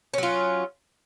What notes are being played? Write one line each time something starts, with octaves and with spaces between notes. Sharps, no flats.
F#3 C#4 F4